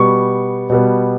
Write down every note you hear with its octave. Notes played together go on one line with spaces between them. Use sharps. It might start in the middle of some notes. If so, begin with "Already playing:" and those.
Already playing: B2 G3 B3 C#6
B2 G3 B3